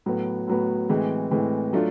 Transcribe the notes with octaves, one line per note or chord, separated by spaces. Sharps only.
A2 F#3 B3
A2 F#3 B3
A2 E3 G#3 C4
A2 E3 G#3 C4
F#3 A3 D4 F4